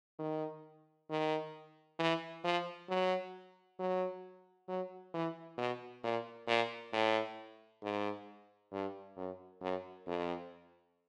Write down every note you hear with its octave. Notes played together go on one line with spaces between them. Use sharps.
D#3
D#3
E3
F3
F#3
F#3
F#3
E3
B2
A#2
A#2
A2
G#2
G2
F#2
F#2
F2